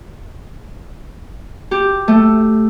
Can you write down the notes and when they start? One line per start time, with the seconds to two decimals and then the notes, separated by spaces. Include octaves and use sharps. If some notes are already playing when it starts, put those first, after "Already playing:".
1.71 G4
2.08 A3